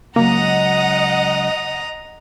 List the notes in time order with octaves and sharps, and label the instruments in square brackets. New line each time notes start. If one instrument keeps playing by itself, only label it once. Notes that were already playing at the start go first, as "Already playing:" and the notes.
[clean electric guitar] C#2 F#3 [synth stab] A#3 [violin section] D#5 F#5 [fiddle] A#5 D#6